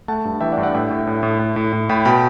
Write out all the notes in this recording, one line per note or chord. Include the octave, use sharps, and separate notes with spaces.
A3 F#5 A5
G2
E3 E5 G5
D5 F#5
G2
D5 F#5
A2 E5 G5
A2
A2
A2
A2
A2
A2
A2 G5 B5
B2 G5 B5